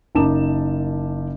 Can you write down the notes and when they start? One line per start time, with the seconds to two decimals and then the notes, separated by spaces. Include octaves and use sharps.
0.15 F#1 F#2 D#4 A5 D6 E7